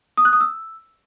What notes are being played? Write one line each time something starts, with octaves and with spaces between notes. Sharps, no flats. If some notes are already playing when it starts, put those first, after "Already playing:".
D#6
F#6
D#6
E6